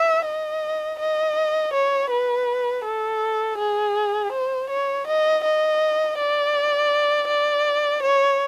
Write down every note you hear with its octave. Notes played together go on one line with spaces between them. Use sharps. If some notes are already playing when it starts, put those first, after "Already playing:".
Already playing: E5
D#5
D#5
C#5
B4
A4
G#4
C5
C#5
D#5
D#5
D5
D5
C#5